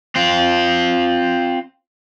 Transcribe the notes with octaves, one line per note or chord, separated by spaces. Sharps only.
C4 F4